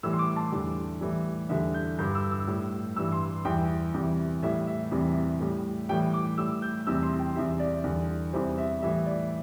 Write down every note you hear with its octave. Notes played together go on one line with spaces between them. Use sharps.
A2 E3 G3 E6
C6
D6
A5
E2 D3 G3
A2 E3 G3
E2 D3 G3 E5
G6
G2 D3 G3 G6
E6
E6
A2 G3
G2 E3 G3 E6
C6
E2 E3 G3 G5
E2 C3 E3 G3
A2 E3 G3 E5
E5
E2 C3 E3 G3
A2 G3
A2 E3 G3 G5
D6
A2 G3 E6
G6
E2 C3 G3 E6
C6
G5
E2 C3 G3 E5
D5
E2 D3 G3
E2 C3 E3 G3 C5
E5
A2 E3 G3 E5
D5